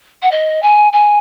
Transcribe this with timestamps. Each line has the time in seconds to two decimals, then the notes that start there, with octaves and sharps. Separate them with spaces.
0.22 F#5
0.31 D#5
0.62 G#5
0.92 G#5